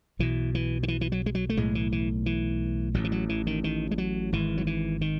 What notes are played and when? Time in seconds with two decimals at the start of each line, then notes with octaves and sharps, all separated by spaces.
0.19 B1 B2 E3
0.55 E3
0.83 D#3
0.88 E3
1.01 E3
1.12 F#3
1.26 G#3
1.35 F#3
1.50 A3
1.57 B1 A2 G#3
1.75 E3
1.92 E3
2.26 E3
2.94 A1 A2 F#3
3.04 E3
3.12 F#3
3.29 E3
3.47 D#3
3.64 D#3
3.91 G#3
3.98 F#3
4.32 G#1 G#2 E3
4.57 F#3
4.67 E3
5.01 D#3